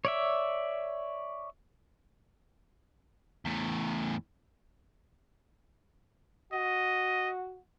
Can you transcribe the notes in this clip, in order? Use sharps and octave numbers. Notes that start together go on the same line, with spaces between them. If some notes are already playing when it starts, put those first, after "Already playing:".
C#5 D5 E5
E2 A2
F#4 D#5